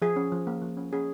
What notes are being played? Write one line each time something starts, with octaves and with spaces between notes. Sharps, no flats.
F3 G#4
C#4
F3
A#3
F3
C#4
C#4 G#4